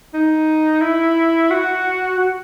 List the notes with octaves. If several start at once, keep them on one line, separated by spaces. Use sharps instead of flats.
D#4
E4
F#4
F#4